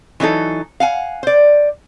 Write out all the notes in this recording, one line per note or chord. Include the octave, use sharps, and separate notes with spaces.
E3 F#3 D#4 A4
F5 F#5 G#5
C5 D5